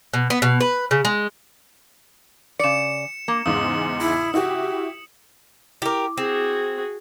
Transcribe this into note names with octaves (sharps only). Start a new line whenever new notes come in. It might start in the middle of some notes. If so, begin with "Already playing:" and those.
B2
B3
B2
B4
C#3
G#3
C#3 D5 C#7 E7
A#3
E2 G#2 C#3 G#3 D#6
E4
E4 F#4 G4
E4 G4 A#4 D6
C4 F#4 G#4